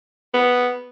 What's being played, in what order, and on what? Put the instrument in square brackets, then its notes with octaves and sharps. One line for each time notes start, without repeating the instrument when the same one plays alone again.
[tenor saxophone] B3